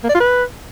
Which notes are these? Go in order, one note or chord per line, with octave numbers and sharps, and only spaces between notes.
A#3
D5
F4
B4